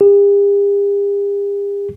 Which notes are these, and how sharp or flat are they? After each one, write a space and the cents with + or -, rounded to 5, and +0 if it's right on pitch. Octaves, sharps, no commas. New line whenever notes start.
G4 +45